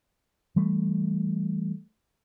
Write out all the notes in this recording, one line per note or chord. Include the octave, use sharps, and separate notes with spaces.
E3 G3 A3